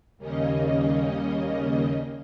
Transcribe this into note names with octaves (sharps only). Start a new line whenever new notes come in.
D#2 C#3 G3 A#3 C#4 D#5